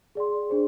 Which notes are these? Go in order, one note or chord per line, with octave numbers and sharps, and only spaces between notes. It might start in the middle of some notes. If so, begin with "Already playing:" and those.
G#4 D5 G5 C6
D4 G#4 C5